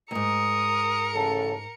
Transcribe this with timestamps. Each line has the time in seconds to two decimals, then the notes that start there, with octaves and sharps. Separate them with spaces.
0.11 D2 G#2 A#4 D#6 C#7
1.13 A1 C#3 A4